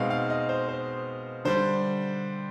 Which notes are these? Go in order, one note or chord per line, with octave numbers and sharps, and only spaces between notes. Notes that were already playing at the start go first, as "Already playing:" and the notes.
Already playing: B2 G#3 C4 D#4 F5
F5
D#5
C5
C5
D3 G3 D4 C5